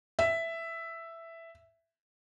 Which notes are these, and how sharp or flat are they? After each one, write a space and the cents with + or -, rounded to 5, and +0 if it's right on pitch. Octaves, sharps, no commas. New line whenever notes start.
E5 +5